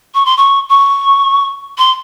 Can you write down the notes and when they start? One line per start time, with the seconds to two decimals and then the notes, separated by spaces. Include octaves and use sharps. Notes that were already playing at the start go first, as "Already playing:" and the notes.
0.14 C#6
0.25 C6
0.37 C#6
0.69 C#6
1.78 C6